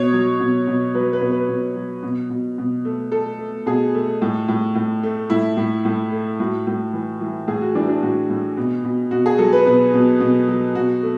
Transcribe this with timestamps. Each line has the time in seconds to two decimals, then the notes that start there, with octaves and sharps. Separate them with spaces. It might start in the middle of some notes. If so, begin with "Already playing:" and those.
Already playing: B2 C#5
0.13 F#3
0.40 B2
0.67 B2
0.94 F#3 B4
1.13 B4
1.21 B2
1.31 B4
1.49 B2
1.75 F#3
2.03 B2
2.30 B2
2.58 B2
2.85 A3
3.12 A3 A4
3.39 A3
3.66 B2 G#4
3.95 A3
4.22 A2
4.48 A2
4.75 A2
5.03 A3
5.30 A2 E4
5.57 A2
5.85 A2
6.12 A3
6.40 A2 F#4
6.67 A2
6.93 E3
7.21 E3
7.47 A2 G#4
7.62 F#4
7.75 E3 D4
7.89 D4
8.03 A2 F#4
8.30 A2
8.57 B2
8.84 B2
9.11 B2 F#4
9.26 G#4
9.38 F#3 A4
9.53 B4
9.66 B2 B4
9.94 B2
10.20 B2
10.48 F#3
10.75 B2 F#4
11.03 A3